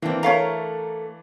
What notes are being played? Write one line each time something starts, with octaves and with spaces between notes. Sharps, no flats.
E3 A#3 C4 D4
A3 A#4 C#5 F5 A#5